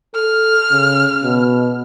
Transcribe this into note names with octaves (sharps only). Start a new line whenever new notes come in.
A4 F6
C#3
B2